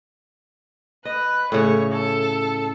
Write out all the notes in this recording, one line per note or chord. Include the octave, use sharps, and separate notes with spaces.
B4 D#5
A2 C#3 C#5
A4